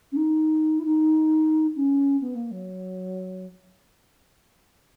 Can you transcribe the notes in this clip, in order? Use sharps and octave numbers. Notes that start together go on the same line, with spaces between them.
C#4
D#4
E4
D#4
C#4
B3
A#3
F#3